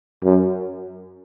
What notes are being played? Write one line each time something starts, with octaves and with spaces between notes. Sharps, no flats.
F#2